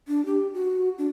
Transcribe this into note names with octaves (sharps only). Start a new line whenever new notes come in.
D4
G4
F#4
D4